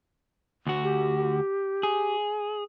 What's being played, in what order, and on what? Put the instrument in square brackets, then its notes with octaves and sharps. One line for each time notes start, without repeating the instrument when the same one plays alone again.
[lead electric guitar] D2 F#4
[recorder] G4
[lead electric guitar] G#4